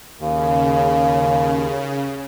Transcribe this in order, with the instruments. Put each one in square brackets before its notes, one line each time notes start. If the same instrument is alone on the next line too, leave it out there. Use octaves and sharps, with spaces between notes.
[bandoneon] D#2 [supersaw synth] C#3